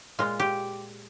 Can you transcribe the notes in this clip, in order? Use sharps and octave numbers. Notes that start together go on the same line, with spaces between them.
A#2 G#3 F4
G4